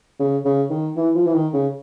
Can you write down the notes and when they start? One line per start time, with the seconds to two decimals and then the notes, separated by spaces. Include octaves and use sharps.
0.19 C#3
0.45 C#3
0.70 D#3
0.96 E3
1.15 F3
1.26 E3
1.34 D#3
1.53 C#3